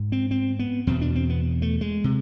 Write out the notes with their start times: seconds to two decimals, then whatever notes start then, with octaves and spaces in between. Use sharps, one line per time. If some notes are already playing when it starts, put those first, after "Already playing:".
Already playing: G#2
0.12 C4
0.31 C4
0.59 B3
0.87 E2 B2 C4
1.01 D4
1.15 C4
1.30 B3
1.62 A3
1.81 G#3
2.04 C3